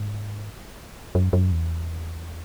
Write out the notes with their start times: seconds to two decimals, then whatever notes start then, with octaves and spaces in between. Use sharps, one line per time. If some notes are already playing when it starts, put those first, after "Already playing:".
Already playing: G#2
1.15 F#2
1.33 F#2
1.52 E2